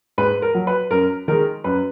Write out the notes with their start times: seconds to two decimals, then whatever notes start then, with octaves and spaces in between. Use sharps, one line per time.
0.18 G#2 B4
0.42 A#4
0.55 F#3
0.67 B4
0.91 F#2 A#4
1.28 D#3 G#3 A#4
1.64 F#2 B4